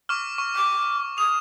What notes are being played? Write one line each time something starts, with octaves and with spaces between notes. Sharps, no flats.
C#6 D6 F6
C#6
D6
D#6 F7